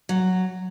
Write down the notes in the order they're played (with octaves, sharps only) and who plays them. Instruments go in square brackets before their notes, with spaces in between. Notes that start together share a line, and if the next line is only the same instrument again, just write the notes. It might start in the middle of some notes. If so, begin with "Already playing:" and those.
[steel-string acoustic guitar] F#3